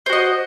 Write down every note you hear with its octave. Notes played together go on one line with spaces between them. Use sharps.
F#4 C5 D#5